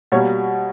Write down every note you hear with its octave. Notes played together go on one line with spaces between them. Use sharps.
B2 G3 A#3 C#5